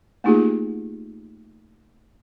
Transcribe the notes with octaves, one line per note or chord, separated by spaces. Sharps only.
A3 A#3 D#4 F4 G4 G#4